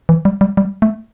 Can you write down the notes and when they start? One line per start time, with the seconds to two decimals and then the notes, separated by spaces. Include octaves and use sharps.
0.09 E3
0.25 G3
0.41 G3
0.57 G3
0.82 A3